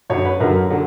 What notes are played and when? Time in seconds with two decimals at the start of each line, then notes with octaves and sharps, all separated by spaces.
0.10 F#2 D3 F#3 C#5
0.25 B4
0.40 F#2 D3 F#3 A#4
0.70 D3 F#3